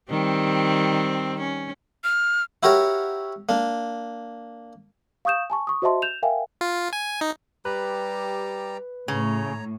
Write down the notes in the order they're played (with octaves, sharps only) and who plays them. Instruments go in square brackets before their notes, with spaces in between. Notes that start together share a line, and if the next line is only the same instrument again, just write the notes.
[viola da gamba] D#3 G3 C4
C#4
[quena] F6
[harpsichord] E4 F#4 G4 A#4 C#5
A#3 D4
[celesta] F5 C#6 D#6 G6 E7
G#5 A5 C#6
C#6 D#6
F#4 C5 D#5 E5 A5 C6
G6 E7 F7
A#4 E5 F5 G5 G#5
[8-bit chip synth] F4
G#5
D#4
[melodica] G3 G4 A#5 [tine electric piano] B4
[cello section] A2 [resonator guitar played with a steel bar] C#3 [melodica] C#5 A#5